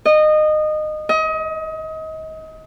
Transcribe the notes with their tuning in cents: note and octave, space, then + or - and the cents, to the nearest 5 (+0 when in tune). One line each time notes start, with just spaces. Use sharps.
D#5 -20
D#5 +30